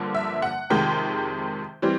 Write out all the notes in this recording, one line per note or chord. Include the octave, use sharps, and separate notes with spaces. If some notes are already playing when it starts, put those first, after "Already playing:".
Already playing: G2 D3 F3 A#3
E5
F#5
F2 C3 D#3 G#3 G5
E3 G3 C4